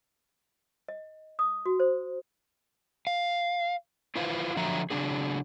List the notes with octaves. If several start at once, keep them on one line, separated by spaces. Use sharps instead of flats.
D#5
D#6
F#4
C5
F5
E4 F4 B4 C5 F5
D3 F3 F#3 E5 A#5
C#3 F#3 A#3 D4 G#4